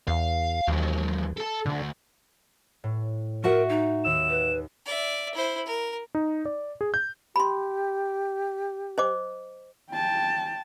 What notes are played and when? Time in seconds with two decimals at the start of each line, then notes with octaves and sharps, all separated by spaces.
0.08 E2 F5
0.68 D#2 E3 F#3
1.37 A4 A5
1.66 D2 A#2 D3
2.84 A2
3.44 F#4 A#4 E5 F#5
3.69 D#4
4.04 D#2 E6 E7
4.29 B4
4.86 D5 E5
5.35 E4 C5
5.66 A#4
6.15 D#4
6.45 D5
6.81 G#4
6.94 G6
7.36 G4 B5 C6
8.98 C5 D#5 D6
9.91 G5 A5